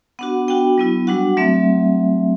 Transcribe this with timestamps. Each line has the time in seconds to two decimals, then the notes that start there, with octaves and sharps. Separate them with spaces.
0.19 B3 D4 F#4 F#5
0.48 B3 D4 F#4 G5
0.78 F#3 B3 E4
1.07 G3 D4 F#4 F#5
1.37 F#3 A3 C4 E5